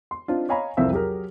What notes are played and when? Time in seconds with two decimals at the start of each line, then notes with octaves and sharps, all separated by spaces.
0.11 C6
0.28 C4 D4 D#4 F4
0.49 C#5 D#5 F5 G#5 A#5 B5
0.77 C2 F2 F3 C4 E5 E6
0.92 F#3 G4 G#4 A#4